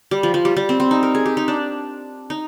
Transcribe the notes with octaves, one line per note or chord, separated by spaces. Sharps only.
G3
F3
F3
G3
G3
C4
C4
D#4
A#4
G#4
G4
D#4
D4
D#4